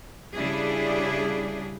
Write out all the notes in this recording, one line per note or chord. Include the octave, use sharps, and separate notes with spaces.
C#3 G3 D4 E4 G#4